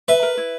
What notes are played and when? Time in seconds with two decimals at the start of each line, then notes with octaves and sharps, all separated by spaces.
0.08 B4 E5
0.22 A#4
0.37 E4